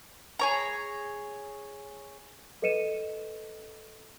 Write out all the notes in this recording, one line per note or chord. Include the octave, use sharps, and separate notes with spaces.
G#4 C#5 A#5
A4 B4 D#5 C#7 D#7 E7